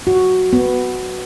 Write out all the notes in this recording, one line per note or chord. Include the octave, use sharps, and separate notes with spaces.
F#4
B3